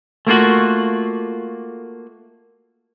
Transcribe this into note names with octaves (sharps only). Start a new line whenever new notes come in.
A3 A#3 F4 F#4